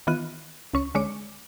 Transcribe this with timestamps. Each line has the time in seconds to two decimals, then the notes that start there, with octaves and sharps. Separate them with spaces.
0.07 D#3 E3 B3 F4 F#6 D#7
0.74 C#2 C#4 C#6
0.95 D3 G#3 C#4 C#5 D6